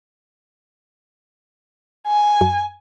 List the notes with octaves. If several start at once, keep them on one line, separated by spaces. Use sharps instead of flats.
G#5
F#2